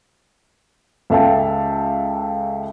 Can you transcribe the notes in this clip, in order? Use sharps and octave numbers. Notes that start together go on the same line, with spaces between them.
C#2 A4 E5 F5 G5 A5